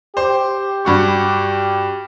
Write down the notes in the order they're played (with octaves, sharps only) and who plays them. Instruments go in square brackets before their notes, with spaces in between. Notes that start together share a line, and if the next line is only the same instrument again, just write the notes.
[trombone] G4 [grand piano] C5
[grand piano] G2 F#4 C#6